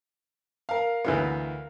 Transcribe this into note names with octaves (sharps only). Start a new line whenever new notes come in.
A#4 F5
D2 E3 B3